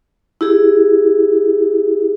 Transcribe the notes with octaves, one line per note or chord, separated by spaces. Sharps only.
E4 G4 G#4